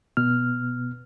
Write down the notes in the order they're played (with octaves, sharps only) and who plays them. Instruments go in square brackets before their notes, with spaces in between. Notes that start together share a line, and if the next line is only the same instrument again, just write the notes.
[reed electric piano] B2 B3 F6